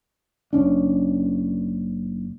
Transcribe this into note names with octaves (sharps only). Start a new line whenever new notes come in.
F#1 C#4 D4